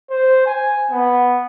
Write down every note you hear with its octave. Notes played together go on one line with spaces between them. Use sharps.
C5
G#5
B3